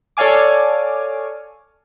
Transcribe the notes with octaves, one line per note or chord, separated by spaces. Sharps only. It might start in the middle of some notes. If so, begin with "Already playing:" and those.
A4 C#5 D5 F5 G#5 D6